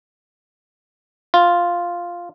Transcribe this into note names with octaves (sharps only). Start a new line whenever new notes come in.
F4